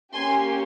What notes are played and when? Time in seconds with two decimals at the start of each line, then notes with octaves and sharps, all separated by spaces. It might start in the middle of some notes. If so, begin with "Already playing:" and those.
0.14 A#3 C#4 G4 G#5 C6